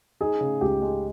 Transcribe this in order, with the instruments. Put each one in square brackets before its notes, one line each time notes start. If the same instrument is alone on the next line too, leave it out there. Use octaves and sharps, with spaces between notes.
[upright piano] D#4 [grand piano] G#4
[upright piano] C#3
[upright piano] C#2 [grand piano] G4
[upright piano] G#3